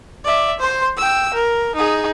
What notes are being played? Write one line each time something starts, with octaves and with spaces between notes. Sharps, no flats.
D5 E5
C5 C6
G5 E6
A#4
D#4 G#4